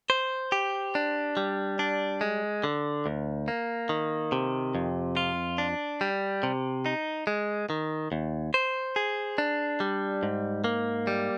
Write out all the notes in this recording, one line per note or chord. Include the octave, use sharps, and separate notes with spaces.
C5
G4
D4
G3
D4
G#3
D3
D2
A#3
D#3
C3
F2
F4
D4
G3
C3
D#4
G#3
D#3
D#2
C5
G#4
D4
G3
G#2
A#3
G3